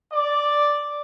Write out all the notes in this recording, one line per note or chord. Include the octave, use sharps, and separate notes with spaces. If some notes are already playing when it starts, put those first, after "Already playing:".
D5